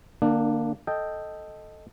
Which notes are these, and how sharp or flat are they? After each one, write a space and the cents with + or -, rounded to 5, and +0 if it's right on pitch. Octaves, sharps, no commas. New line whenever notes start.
D3 +40 A#3 +0 D4 +15
A4 +0 D#5 +0 G5 +0